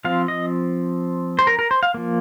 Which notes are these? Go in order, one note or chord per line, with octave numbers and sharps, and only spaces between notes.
F3 C4 F5
D#5
C5
A#4
A#4
C5
F5
F3 A#3